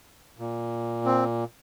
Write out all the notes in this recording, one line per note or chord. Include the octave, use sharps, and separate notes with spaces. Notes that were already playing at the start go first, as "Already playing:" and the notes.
A#2
C4